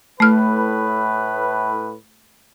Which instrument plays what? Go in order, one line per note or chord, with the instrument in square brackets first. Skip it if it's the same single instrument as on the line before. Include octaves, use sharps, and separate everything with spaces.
[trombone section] A2 B4 [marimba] A3 F6